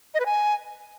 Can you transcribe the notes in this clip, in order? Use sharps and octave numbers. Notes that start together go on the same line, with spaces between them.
D#5
B4
G#5